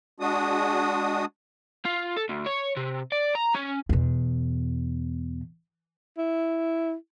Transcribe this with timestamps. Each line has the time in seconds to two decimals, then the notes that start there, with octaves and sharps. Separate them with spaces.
0.20 G#3 D4 F#4 D#6
1.85 F4
2.17 A4
2.29 D2
2.46 C#5
2.77 C3
3.12 D5
3.35 A#5
3.55 C#4
3.89 E2 B2
6.18 E4